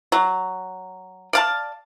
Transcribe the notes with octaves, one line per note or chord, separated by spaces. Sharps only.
F#3
D5 F5 A5